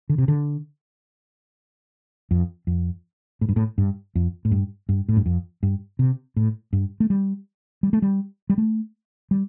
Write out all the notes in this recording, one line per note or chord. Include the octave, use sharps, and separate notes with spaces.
D3
C3
D3
F2
F2
A2
G2
A2
G2
F2
A2
G2
G2
A2
G2
F2
G2
C3
A2
G2
A3
G3
G3
A3
G3
G3
A3
G3